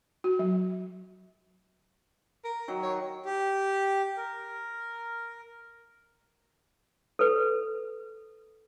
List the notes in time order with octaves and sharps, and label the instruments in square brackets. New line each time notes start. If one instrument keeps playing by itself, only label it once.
[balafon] F#4
F#3
[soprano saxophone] A#4
[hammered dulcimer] D#3 F#3
[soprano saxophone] C#5
[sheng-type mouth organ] G4
A#4
[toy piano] A4 B4